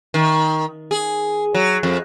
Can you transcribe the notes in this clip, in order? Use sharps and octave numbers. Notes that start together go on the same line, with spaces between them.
D#3
G#4
F#3
F2